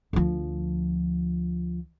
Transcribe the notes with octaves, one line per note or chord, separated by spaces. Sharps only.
D2 F3